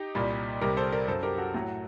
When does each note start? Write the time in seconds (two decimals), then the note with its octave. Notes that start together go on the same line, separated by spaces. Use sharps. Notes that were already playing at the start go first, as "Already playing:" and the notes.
Already playing: D#4 G4
0.15 C2 A#2 G3
0.61 C2 C3 G3 G4 A#4
0.77 A4 C5
0.92 A#4 D5
1.08 F#2 F#3 A4 C5
1.23 G4 A#4
1.38 F#4 A4
1.54 A2 F#3